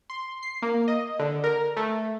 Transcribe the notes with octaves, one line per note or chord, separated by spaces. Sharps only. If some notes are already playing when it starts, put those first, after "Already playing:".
C6
C7
A#3
D#5
D3
A#4
A3